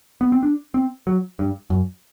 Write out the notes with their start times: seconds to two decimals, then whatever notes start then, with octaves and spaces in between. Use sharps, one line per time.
0.21 B3
0.32 C4
0.43 D4
0.74 C4
1.07 F#3
1.39 G2
1.70 F#2